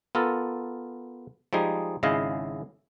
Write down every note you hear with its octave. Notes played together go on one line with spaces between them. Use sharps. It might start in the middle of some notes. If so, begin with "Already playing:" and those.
B3 F4 A4 A#4
F3 G3 G#3 D#4 G#4
G#1 C#3 G#3 E4 D#5 F5